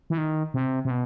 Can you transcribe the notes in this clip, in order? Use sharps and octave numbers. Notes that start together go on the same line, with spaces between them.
E3
D#3
C3
C3
B2